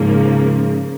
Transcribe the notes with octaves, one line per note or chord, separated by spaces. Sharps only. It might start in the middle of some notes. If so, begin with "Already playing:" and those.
Already playing: G#2 C#3 F3 A#3